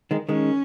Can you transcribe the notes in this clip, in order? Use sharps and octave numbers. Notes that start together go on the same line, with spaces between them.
D#3 G#3
D#3 G#3 C#4